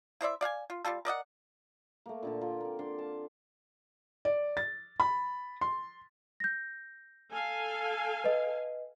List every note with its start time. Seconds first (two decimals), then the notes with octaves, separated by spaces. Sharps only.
0.21 E4 C5 D5 E5
0.41 D5 F5 F#5 G#5
0.70 F4
0.85 G3 B3 F4 A4
1.05 A#4 D5 D#5 F#5
2.06 A3 A#3
2.23 A#2 D3 A5
2.41 A#3 F4 A4 A#4
2.60 A#3 C4
2.79 D3 D5 C6
2.99 A5
4.25 D5
4.57 A6
5.00 B5
5.61 C6
6.40 G6 A#6
7.33 A4 F5 G#5
8.24 B4 D#5